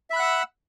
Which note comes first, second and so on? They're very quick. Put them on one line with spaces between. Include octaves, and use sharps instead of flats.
E5 B5 F#6 F#5 E6